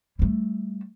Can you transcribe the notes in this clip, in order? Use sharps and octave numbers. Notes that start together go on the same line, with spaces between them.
G3 A3